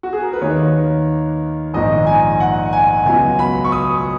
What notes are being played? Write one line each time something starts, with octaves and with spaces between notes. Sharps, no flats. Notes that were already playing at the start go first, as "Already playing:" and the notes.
F#4
G#4
A#4
B4
D#2 D#3 A#3 D#4 C#5
A#1 G#2 D#3 D#5
G#5
F#5
G#5
C#2 B2 F#3 G#5
B5
C#6
D#6